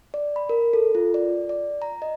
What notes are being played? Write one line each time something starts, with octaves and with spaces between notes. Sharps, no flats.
D5
B5
A#4
A4
F4
D5
D5
A#5
D#5